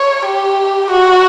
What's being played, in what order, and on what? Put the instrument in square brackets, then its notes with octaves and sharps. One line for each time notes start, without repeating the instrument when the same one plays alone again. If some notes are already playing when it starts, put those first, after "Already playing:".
Already playing: [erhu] C#5
G4
F#4